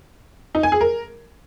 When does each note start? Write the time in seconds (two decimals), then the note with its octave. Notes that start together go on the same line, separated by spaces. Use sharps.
0.55 D#4
0.63 G#5
0.72 G#4
0.81 A#4